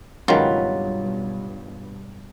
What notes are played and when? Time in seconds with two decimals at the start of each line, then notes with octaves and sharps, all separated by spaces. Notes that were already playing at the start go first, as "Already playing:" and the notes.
0.28 C#2 G2 B2 D#3 F#3 F4 G4 B4